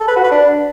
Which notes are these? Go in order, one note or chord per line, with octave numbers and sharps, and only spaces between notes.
A4
B4
F#4
B4
D4